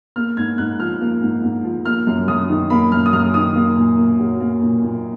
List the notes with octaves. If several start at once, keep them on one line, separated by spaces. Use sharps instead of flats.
A#3 F6
G#2 G#6
G#2 F#6
F3 F6
A#3
G#2
G#2
F3
A#3 F6
F#2
F#2 D#6
D#3
A#3 B5
F#2 F6
D#6
F#2 F6
D#3 D#6
A#3
A#2
A#2
F#3
A#3
A#2
A#2